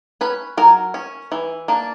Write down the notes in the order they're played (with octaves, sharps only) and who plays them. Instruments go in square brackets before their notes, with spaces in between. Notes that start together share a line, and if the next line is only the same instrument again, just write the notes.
[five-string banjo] C#4 B4
F#3 A#4
C#4
E3
A#3 D4